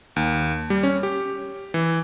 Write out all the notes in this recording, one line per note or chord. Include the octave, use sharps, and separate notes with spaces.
D#2
G3
C#4
G4
E3